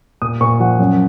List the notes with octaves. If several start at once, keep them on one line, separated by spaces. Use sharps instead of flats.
A#2 D#6
A#2 C#6
F3 F#5
F#2